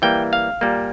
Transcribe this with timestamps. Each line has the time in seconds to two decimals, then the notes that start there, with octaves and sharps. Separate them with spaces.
0.02 E3 G3 A#3 G5
0.33 F5
0.61 A#2 G3 A#3